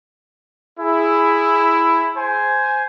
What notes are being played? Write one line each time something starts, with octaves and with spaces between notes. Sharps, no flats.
E4 G#4
C5 G#5